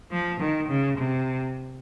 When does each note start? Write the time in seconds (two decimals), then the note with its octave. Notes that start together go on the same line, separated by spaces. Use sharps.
0.11 F3
0.40 D#3
0.69 C#3
0.98 C3